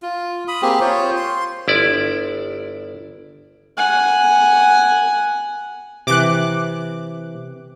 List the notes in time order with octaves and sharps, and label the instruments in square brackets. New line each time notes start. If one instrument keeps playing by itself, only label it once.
[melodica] F4
B5 D#6
A#3 C4 G4 G#4
F4 C5 C#5
C6
[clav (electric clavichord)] G1 E4 D5
[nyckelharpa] F#5 G#5
[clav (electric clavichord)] C3 E3 [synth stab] D6 F#6